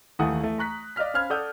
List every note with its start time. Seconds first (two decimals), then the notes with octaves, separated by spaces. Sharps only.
0.19 D#2 E3 A3 F#5 G#5 D#6
0.39 E3 A3
0.58 A#5 C#6 F#6 B6
0.96 D5 D#5 F5 F6 B6
1.14 C#4 C5 F5 B5 F6 G#6
1.30 A4 D5 F#5 D#6 E6 G6